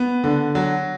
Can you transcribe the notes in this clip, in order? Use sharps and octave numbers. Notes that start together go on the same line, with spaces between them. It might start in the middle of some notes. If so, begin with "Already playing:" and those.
Already playing: B3
D3
F#3